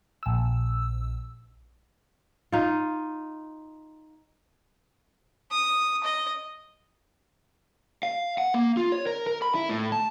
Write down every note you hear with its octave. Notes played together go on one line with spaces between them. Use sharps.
A#1 E6
D#4 F4
D#6
D#5
F5
F#5
A#3
F4
C#5
A#4
A#4
B5
E4
A2
A5